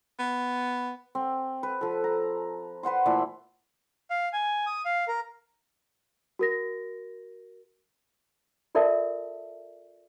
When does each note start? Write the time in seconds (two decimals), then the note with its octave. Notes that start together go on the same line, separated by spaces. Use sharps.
0.20 B3
1.15 C4
1.63 B4
1.81 F3 A4
2.04 A#5
2.83 B4 C5 F#5 C6
3.06 A#2 E3 A3 A4
4.10 F5
4.33 G#5
4.67 D#6
4.85 F5
5.08 A#4
6.39 F#4 A#4 A#6
8.75 F4 A4 A#4 D5 E5 A5